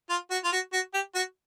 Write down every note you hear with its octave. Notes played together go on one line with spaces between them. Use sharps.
F4
F#4
F4
F#4
F#4
G4
F#4